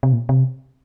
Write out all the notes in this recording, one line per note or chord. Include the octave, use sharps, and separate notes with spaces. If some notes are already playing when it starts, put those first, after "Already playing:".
C3
A#2
C3